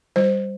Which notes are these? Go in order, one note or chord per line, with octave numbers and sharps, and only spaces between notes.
G3 C5